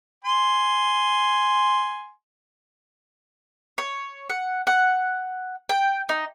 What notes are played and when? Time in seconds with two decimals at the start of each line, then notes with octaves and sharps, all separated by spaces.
0.24 G#5 C6
3.78 C#5
4.30 F#5
4.67 F#5
5.69 G5
6.09 D#4